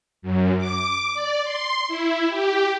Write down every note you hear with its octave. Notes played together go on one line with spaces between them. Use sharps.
F#2
D6
D5
C6
E4
G4